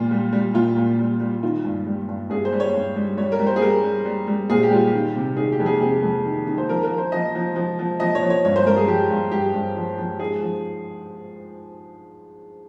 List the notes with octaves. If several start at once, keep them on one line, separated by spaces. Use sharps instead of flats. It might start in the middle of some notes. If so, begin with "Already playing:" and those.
Already playing: A#2 G3 F4
G3
G3
A#2 F4
A#2
G3
G3
D#3 F4
G2
G3
G2
G2 G#4
C5
G3
C#5
G2
G3
G3 C#5
A#4
G3
C5
G#4
G3 A#4
G3
G3
G3
A#2 G#4
G4
G3 F4
G4
D#3
C3
D#3 G#4
G4
F2
G#4
C3 G#4
F2
D#3
D#3
C5
F3 A#4
A#4
F3
C5
F3 D#5
F3
F3
F3
F3 D#5
C#5
F3
C#5
G2 C#5
C5
G2 A#4
G#4
F3 G4
G2
G2 G4
G2
F3
F3
G#2 G#4
F3